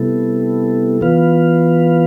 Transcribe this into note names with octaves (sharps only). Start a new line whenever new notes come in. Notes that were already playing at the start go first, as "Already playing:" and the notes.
Already playing: C3 G3 B3 E4 A4
E3 B3 F4 B4 F5